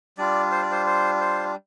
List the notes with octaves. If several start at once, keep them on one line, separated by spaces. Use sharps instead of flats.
G3 D4 F4 D5
C5
D5
C5
C5
C5